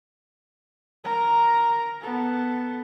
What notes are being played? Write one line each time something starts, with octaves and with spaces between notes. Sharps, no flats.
A#4 A#5
B3 A4